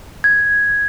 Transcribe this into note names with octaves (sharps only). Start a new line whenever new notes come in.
G#6